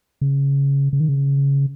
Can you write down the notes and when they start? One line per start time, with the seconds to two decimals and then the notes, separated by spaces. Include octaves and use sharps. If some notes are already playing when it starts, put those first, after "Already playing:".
0.21 C#3
0.93 C#3
1.00 D#3
1.09 C#3